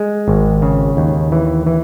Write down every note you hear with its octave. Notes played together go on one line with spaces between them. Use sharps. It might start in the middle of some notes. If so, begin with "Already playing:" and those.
Already playing: G#3
G#1
C#3
D#2
E3
E3